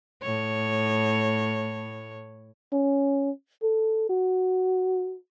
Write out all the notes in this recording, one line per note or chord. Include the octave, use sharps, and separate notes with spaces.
A2 C#5
C#4
A4
F#4